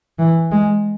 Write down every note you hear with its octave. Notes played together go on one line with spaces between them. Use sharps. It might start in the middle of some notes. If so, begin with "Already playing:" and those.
E3
G#3